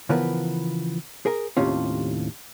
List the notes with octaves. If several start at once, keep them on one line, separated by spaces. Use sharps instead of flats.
C#3 E3 F3 B3 A#4 B4
G#4 A#4
D#2 A2 C3 C#4 F4